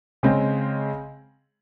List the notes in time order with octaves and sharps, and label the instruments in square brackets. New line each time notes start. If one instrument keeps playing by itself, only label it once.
[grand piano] C#3 G#3 C4